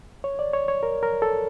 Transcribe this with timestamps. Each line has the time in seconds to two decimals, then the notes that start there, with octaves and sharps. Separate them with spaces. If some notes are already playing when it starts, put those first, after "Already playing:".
0.24 C#5
0.39 D5
0.54 C#5
0.68 C#5
0.83 A#4
1.03 A#4
1.22 A4